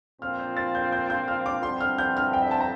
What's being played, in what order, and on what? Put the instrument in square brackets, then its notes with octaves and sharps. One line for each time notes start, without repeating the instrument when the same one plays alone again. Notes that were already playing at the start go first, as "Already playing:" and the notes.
[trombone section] A#2 F3 C4 F4 [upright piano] F6
[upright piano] G6
A6
G6
G6
G6
F6
D6
[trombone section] G2 D3 F3 C4 E4 [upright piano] C6
[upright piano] F6
G6
F6
G5
E5
A5
A#5